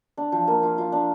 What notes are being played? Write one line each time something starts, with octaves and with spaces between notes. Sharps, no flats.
D4
F3
A#3
F4
F4
D4